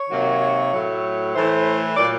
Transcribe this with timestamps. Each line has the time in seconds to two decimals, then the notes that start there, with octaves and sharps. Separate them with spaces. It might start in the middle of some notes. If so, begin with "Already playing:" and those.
Already playing: C#5
0.09 C3 D#3 F#3 A#3
0.72 A2 F#3 A3
1.34 A2 E3 A3 C5
1.96 A#2 F#3 A#3 D5